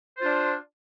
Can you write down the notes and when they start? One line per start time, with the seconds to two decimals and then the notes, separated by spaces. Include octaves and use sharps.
0.17 C5
0.21 F4
0.24 D4